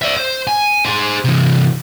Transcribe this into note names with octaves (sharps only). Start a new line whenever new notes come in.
D5 E5
C5
G#5
G#4 C5
C3 E3